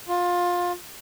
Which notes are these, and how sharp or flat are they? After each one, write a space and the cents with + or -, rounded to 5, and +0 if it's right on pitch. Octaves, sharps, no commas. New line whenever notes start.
F4 +20